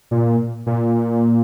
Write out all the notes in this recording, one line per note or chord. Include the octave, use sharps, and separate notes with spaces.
A#2
A#2